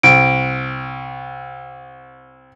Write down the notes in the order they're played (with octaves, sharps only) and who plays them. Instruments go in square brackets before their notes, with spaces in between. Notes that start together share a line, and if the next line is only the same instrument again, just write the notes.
[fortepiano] C2 [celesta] D7